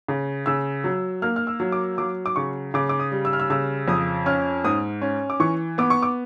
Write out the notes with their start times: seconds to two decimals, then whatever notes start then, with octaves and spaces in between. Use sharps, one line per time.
0.08 C#3
0.46 C#3 E6
0.84 F#3
1.22 A#3 F6
1.36 F6
1.47 E6
1.60 F#3
1.72 D6
1.98 F#3 D6
2.26 D6
2.36 C#3 C#6
2.74 C#3 D6
2.89 D6
3.00 D#6
3.12 G3
3.25 E6
3.33 F6
3.40 E6
3.50 C#3 E6
3.88 F2 D#6
4.26 C#4 F6
4.64 G#2 D#6
5.02 C#4
5.30 D6
5.40 E3 C#6
5.78 B3 D6
5.90 C#6
6.03 D6